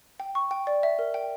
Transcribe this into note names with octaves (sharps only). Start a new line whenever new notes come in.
G5
C#6
G5
D5
E5
A#4
G5